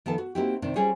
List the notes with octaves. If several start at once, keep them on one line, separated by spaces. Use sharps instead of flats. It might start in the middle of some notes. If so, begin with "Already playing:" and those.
D#3 F3 B3 A4 A5
F#4
A#3 C4 D#4 E4 F#4 G4
C3 D#3 C4 D4
G3 C#4 F4 G#4 C5 C#5